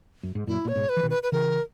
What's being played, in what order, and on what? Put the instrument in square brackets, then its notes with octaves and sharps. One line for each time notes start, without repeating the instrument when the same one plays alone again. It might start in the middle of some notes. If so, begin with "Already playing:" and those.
[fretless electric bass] F#2
G#2
[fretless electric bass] F#2 A#2 [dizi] E4
[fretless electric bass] A#2 [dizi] C#5
[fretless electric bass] G#2 B2
[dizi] B4
[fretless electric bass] E3
B2 D#3
[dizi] B4
B4
[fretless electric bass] C#3 E3 [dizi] A#4